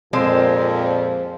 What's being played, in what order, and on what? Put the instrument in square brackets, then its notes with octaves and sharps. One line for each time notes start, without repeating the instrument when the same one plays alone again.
[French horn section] F2 A#2 [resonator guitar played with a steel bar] F3 G#3 C4